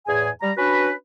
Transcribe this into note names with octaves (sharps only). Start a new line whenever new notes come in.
E2 A2 G#4 G#5
G3 A#5
C#4 D4 F#4 B4